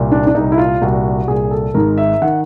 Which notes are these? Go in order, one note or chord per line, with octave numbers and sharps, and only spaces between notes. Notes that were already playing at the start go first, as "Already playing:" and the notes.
Already playing: C2 A#2
D4
D4
C2 A#2 D#4
E4
F4
C2 A#2 F#4
C2 A#2 G#4
A4
G#1 G#2 D#3 A#4
E5
D#3 F#5